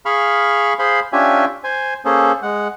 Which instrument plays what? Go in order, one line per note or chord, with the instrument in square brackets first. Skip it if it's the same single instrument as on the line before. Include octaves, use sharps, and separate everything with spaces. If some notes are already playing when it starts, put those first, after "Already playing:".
[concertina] G#4 F5 B5 C#6 F6
G#4 C5 F5 B5 C6
C#4 D4 F4 G4 E5 G#5
C5 G#5
A#3 C#4 G#4 A4 C5
G#3 F#5